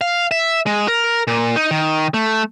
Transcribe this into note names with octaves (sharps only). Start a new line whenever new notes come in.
F5
E5
G#3
A#4
A#2
D#4
D#3
A3